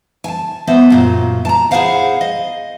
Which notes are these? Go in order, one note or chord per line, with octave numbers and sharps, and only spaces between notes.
G#5 A5
B3 C5 D#5 E5
F#2 A#2
A5 A#5
E4 G#4 A#4 C5 F5 F#5
D#5